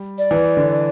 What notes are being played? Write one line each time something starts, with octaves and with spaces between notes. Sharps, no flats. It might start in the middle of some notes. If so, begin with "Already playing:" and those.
Already playing: G3
D5
E3
D3